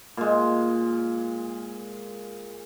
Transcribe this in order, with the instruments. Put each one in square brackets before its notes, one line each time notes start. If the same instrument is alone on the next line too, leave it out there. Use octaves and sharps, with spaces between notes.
[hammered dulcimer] A#2 G#3